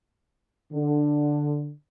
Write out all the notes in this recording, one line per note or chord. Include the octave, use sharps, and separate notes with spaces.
D3